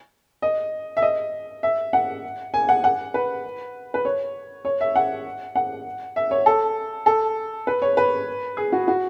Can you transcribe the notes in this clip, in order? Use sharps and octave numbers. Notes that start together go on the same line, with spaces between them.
D#5
E5
D#5
E5
F#5
G#5
F#5
F#5
B4
B4
C#5
C#5
E5
F#5
F#5
E5
C#5
A4
A4
B4
C#5
B4
G#4
F#4
F#4